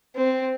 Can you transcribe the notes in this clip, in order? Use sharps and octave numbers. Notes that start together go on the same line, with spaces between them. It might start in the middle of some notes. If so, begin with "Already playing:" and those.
C4